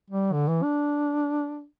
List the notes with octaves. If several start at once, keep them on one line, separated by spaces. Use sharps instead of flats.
G3
D3
E3
D4